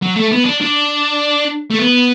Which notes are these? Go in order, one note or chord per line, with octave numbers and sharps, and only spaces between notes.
F#3
A3
B3
D4
D4
A3
B3